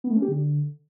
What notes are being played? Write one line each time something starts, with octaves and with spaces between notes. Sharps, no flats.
B3
A3
C#4
G4
D3